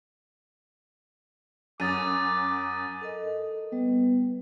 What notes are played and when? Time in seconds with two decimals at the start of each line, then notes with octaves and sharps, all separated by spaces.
1.80 F#2 D6 D#6 A6 D#7
3.01 A4 A#4 D#5
3.73 G3 B3